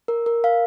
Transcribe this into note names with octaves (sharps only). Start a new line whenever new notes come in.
A#4
A#4
F5